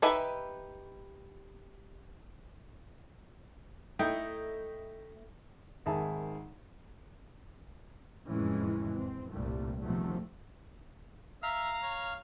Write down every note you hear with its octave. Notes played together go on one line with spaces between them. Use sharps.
D#4 G4 B4 E5 G#5
A3 D#4 E4 G5
G#1 D#3 G#3 G#4 E5 A5
F#1 F2 A2 E3 G#3 C#4
C4
C2 G2 A#2 G3 A3
E2 C3 D#3 F3 F#3 A3
E5 F5 A#5 F6
C#5